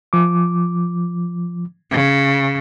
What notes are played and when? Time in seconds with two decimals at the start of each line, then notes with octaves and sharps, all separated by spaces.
0.13 F3 D6
1.92 C#3